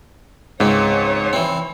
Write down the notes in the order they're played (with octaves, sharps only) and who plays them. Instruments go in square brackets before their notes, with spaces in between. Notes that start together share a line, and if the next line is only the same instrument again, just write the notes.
[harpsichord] C#2 C4 [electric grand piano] G#2 [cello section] C#5
[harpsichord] E3 C4